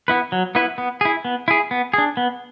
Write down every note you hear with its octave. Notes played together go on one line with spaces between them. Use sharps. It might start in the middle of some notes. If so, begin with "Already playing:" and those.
B3 E4 B4
F#3
B3 E4 B4
B3
E4 G#4
B3
E4 G#4
B3
D4 G#4
B3